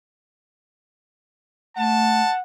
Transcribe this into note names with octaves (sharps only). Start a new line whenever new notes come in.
A3 F#5 A5